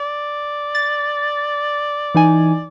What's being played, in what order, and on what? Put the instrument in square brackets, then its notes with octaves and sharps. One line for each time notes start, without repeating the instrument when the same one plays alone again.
[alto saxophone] D5
[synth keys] A6
E3 D#4 G#5